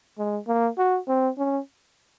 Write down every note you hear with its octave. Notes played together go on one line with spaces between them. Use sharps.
G#3
A#3
F#4
C4
C#4